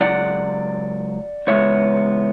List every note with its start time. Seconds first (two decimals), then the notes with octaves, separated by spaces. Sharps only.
0.01 C#2 C#3 F#3 D5 F#5
1.47 E2 C#3 G#3 B3 C#5 E5